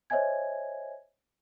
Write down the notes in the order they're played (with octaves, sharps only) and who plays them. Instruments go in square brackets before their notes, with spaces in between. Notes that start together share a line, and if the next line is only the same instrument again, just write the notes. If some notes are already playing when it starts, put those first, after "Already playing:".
[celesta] C5 C#5 D#5 E5 G#5 G#6